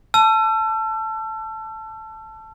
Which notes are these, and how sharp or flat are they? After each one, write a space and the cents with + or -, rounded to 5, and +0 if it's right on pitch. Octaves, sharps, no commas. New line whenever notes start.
A5 +0 E6 +40